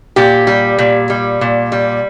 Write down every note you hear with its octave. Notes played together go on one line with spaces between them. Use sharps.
A#2 G4
G3
A#2
G3
A#2
G3